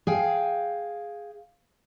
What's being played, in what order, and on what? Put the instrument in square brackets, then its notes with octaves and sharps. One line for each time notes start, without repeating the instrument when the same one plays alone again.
[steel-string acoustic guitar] G#4 F5 G5